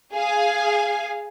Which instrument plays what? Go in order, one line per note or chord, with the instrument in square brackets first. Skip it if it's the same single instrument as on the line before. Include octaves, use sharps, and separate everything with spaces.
[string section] G#4 F5 G#5